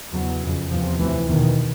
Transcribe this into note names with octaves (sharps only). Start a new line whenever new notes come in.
E2 C#3 F#3
F2 C#3
E2 C3 F3
D2 C3 E3
E2 B2 D#3